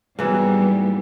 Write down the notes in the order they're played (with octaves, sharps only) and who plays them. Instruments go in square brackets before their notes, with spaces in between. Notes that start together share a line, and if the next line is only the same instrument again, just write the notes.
[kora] G#2 E3 F#3 [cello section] G3 A#3 B3